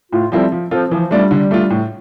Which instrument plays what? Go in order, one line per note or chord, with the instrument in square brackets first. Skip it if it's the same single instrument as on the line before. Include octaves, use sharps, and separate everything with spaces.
[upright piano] A2 [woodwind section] F4
[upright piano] F3 C4 E4 A4 [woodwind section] G3
[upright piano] F3
[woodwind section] F3 [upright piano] C4 F4 A4
[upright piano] E3 [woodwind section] F3
[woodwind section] G3 [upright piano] A3 D4 F4
[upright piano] D3
A3 D4 F4
A2